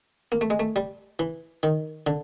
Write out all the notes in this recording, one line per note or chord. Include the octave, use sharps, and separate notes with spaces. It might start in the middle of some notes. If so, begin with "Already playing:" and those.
A#3
A3
G#3
A3
G3
E3
D#3
D3